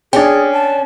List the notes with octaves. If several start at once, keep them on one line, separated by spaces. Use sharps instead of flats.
C#4 D4 G#4 G5
A5